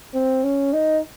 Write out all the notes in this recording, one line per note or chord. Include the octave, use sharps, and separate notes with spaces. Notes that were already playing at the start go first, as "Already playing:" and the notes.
C4
C#4
D#4